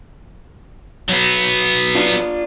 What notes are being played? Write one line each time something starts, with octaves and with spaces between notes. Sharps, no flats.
F#3 B3
D4 F4